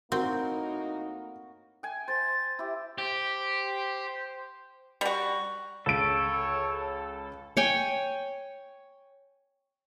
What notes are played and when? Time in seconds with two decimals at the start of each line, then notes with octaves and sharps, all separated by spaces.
0.12 A2 A#3 C4 D#4 F#4 A#4
1.83 G5 G#5
2.08 C5 G#5 A6
2.59 E4 G4
2.98 G4 C5
5.01 G3 F#4
5.86 C#2 A4 C#5 D7
7.57 C#5 G5 G#5